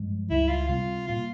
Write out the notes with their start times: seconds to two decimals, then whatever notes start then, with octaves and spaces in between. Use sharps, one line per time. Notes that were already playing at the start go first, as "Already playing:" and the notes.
Already playing: G2 F3 G#3
0.29 C#2 C#3 G3 E4
0.49 F4
0.68 C3 G3 C4 F4
1.07 A#2 G3 F4